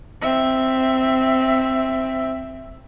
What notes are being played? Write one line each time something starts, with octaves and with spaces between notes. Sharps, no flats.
C4 E5